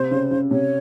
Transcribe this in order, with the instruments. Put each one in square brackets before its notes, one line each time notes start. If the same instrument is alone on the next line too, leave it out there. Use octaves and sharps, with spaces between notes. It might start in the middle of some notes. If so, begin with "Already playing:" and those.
Already playing: [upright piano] C3 [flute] C5
[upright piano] C#3
C#3
[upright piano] C3 [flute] C#5